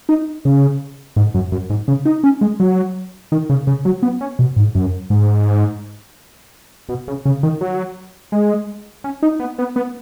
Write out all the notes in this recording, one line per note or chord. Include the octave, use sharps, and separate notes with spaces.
D#4
C#3
G#2
F#2
F#2
G#2
C#3
D#4
C#4
G#3
F#3
D#3
C#3
C#3
F#3
B3
C#4
B2
G#2
F#2
G#2
B2
C#3
C#3
D#3
F#3
G#3
C#4
D#4
B3
B3
B3